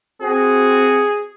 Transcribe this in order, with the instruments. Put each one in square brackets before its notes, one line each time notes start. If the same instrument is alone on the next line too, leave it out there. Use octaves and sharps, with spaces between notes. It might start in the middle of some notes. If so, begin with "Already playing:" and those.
[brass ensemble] C4 F#4 [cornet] G#4